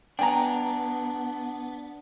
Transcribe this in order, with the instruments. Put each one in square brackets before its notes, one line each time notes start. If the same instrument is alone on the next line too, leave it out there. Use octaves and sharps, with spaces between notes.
[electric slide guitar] B3 D4 [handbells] G5 G#5 A#5